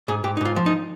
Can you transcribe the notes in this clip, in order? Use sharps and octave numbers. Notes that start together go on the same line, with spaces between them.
G#2 G#4
G#2 G4
D#4
G#2 F4
F3
D#4